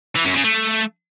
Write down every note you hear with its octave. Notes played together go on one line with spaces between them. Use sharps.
E3
F#2
C#3
A3